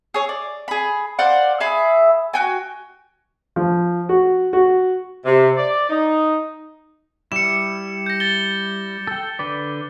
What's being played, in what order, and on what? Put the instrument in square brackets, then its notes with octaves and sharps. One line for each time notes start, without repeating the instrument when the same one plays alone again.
[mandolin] G#4 C#5
D5
G#4 B5
C5 D5 F5 F#5
G#4 E5 F5 B5
F#4 G5 G#5
[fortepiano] F3
F#4
F#4
[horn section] C3
D5
D#4
[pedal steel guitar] G3 E4 [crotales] C#7 E7
[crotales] G6 A#6
A6 G7
[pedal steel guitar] A4 G5
D3 B4 D5